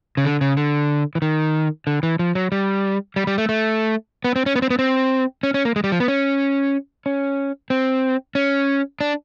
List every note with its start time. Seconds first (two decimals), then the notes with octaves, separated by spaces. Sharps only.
0.17 C#3
0.25 D3
0.41 C#3
0.57 D3
1.15 E3
1.22 D#3
1.87 D3
2.03 E3
2.19 F3
2.35 F#3
2.52 G3
3.16 G3
3.27 G3
3.38 A3
3.49 A3
4.24 B3
4.36 C4
4.46 C#4
4.56 B3
4.62 C4
4.70 B3
4.79 C4
5.43 C#4
5.54 C#4
5.65 A#3
5.76 G#3
5.84 G3
5.92 F3
6.00 B3
6.08 C#4
7.06 C#4
7.70 C4
8.35 C#4
9.01 D4